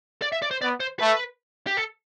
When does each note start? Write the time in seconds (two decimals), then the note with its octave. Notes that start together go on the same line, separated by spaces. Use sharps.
0.22 D5
0.32 E5
0.42 D5
0.51 C5
0.61 B3 D5
0.80 C5
0.99 A3 B4
1.67 G4
1.77 A4